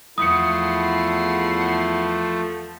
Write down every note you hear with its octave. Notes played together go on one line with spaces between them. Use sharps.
E2 F3 A3 E4 F#5 D#6 C7 C#7